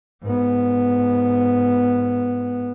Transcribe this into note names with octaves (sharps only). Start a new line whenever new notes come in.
G#2 B3